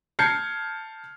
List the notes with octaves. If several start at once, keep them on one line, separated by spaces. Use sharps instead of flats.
A5 F6 G6 G#6 C7 C#7